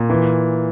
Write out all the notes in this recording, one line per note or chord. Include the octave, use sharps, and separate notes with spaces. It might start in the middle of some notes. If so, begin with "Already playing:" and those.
Already playing: A#2
E3